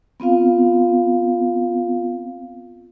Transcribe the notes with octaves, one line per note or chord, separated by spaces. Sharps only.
B3 C4 F4 F5